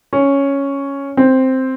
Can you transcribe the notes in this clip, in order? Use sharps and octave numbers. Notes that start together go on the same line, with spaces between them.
C#4
C4